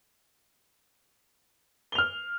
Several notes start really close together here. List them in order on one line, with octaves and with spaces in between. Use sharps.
G7 F7 F6